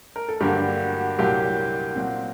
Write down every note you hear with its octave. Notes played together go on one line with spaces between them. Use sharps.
A#4
A4
G2 D3 F#3 A#3 G4
F#4
F#4
C2 A#2 F#3 A#3 G4
A#2 F#3 C4